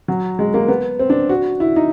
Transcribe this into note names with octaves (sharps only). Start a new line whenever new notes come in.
F#3
G#3
A#3
B3
C4
D4
F#4
E4
D#4